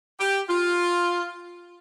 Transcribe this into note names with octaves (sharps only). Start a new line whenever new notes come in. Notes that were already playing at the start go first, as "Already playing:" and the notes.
G4
F4